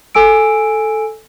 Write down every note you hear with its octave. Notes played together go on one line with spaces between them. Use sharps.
A4 G#5 E6 D7